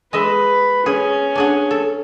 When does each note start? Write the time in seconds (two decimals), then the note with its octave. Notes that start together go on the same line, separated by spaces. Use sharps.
0.13 G#3 B4 D#5 E5
0.86 C#4 G#4
1.35 D4 G#4 F#5
1.71 A4